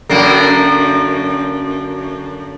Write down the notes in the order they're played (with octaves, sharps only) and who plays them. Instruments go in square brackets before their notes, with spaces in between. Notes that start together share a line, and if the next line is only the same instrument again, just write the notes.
[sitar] F#2 D3 A#3